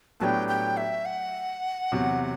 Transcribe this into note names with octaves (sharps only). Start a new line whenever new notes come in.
A2 F#3 B3 D4 G4 G5 A5
G5
E5
F#5
E2 C3 F#3